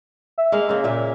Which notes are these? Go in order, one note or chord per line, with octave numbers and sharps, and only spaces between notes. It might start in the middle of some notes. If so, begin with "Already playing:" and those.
E5
G#3 A#3 F5
C#3 A#3
A#2 E5
C#4